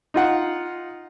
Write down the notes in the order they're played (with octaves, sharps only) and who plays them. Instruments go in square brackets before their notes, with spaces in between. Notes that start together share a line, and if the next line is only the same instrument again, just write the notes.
[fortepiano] D#4 F4 F#5